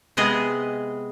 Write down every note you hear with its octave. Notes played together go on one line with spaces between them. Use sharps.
C3 G#3 B3 G#4 D#5